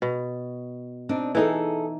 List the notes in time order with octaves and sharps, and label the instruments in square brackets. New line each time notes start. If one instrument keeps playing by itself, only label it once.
[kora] B2
[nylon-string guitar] C4 D4 D#4
[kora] E3 D#4 [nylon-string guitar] E4 G#4 A4